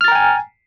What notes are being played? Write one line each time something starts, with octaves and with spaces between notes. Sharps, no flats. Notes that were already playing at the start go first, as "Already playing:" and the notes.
G5 G#5 A#5 F6 A6